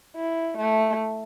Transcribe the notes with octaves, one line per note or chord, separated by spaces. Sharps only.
E4
A3